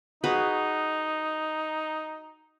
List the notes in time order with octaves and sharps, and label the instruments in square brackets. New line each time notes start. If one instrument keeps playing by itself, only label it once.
[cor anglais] D#4 [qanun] F#4 G#4 B4